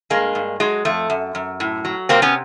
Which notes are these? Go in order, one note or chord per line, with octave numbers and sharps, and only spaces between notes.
G2 G#3 A#3
G2
F#3 G#3
F2 A3
F#2
F#2
A2
F#3
C3 A#3 C4
B3 C#4